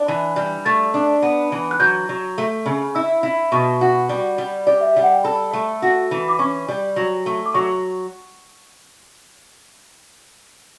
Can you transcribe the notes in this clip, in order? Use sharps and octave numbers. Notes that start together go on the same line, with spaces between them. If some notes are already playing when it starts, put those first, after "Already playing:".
Already playing: D4
E3
G3
A3 A6
D4
B3
E3
F#6
F#3 G6
F#3
A3
C#3
E4 E6
E4
B2 C#6
F#4
G3
G3
G4 D5
E5
G3
F#5
G5
A4 B5
A3
F#4
E3
D6
C#4 C#6
G3
F#3
A3
D6
F#3 C#6